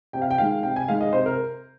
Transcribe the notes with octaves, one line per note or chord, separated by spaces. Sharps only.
C3 G5
F5
G5
D#3 G#3 F5
C3 G5
G#5
D#3 G#3 F5
D#5
C3 C5
A#4